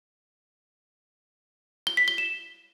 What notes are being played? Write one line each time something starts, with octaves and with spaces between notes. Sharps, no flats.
G7
B6
G7
E7